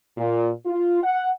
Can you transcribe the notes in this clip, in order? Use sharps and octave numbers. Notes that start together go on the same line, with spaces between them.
A#2
F4
F#5